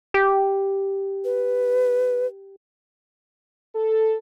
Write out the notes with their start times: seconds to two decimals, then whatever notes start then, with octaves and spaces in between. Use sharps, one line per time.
0.14 G4
1.25 B4
3.75 A4